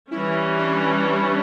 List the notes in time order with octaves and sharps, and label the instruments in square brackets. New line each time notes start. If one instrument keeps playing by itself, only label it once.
[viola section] E3 G3 C#4 [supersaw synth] E4
[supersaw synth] D4